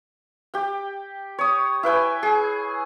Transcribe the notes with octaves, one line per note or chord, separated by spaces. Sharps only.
G4 G5
C#5 D#6
E4 B4 G5 G#5
G#4